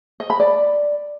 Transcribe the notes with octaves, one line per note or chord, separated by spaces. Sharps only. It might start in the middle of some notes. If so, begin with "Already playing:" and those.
D#5
B5
D5